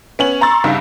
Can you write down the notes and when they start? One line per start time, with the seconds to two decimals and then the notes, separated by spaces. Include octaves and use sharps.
0.19 B3 C#4 F#7
0.41 A#5 C6 C#6 E6 A6
0.64 C2 G2 C#3 D#4